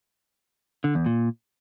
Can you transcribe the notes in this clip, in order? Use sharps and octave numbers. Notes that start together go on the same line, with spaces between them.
D3
E2
A#2